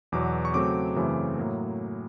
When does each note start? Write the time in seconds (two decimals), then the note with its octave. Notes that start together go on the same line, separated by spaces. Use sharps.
0.12 E2 B2 F#3 D6
0.45 C#6
0.54 C#3 F#3 A3 C4 D6
0.96 F#2 C#3 E3 A3 C4
1.38 A2 F#3 A#3